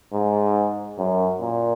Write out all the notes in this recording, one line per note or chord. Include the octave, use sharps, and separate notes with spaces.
G#2
F#2
A#2